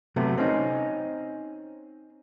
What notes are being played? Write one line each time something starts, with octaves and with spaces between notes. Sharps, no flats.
C3 F#3 A3 B3
C4 C#4 D#4